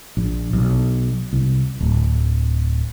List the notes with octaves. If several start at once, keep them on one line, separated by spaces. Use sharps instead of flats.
A#1
B1
C2
D1